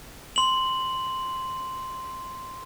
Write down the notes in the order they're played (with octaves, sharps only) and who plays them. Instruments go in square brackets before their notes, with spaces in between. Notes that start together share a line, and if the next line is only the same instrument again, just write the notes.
[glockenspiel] C6 F#7